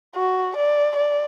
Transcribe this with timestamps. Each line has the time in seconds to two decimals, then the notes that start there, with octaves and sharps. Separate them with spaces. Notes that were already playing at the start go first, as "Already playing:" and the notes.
0.16 F#4
0.57 D5
0.97 D5